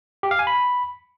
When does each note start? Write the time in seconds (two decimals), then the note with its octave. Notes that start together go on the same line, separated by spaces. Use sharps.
0.23 G4
0.31 F5
0.39 G#5
0.47 B5